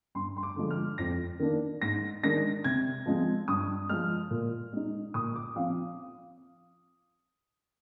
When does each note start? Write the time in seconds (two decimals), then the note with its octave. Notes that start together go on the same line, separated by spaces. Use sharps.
0.15 G2 C6
0.37 C6
0.43 D6
0.56 D3 F3 G#3
0.70 F6
0.98 F2 A#6
1.39 D#3 A#3 D4
1.82 G#2 A#6
2.23 D#3 G#3 D4 A#6
2.64 C3 G#6
3.06 F3 G#3 C4
3.48 G2 D#6
3.89 F3 G#3 F6
4.31 A#2
4.72 G#3 D#4
5.14 A#2 D#6
5.35 D6
5.55 F3 F5
5.59 C4